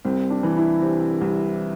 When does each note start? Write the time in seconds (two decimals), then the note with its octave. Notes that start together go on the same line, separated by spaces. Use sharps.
0.05 C2 C4
0.30 D4
0.43 E3
0.57 E4
0.82 C3 C4
1.21 C2